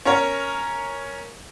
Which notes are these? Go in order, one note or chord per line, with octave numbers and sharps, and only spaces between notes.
C#4 A#4 C#5